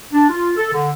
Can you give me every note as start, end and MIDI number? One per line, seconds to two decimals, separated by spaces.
0.12 0.29 62
0.30 0.51 65
0.57 0.72 69
0.73 0.89 50